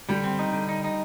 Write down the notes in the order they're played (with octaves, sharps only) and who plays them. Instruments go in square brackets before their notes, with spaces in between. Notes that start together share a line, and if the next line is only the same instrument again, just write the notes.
[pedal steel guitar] D3 [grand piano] G3
[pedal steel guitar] C4
D#4
D3
D#4
D#4